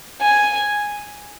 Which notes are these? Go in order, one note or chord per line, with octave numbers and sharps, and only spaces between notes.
G#5